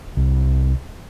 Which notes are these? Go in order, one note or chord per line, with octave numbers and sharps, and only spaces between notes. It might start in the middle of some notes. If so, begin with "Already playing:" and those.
C2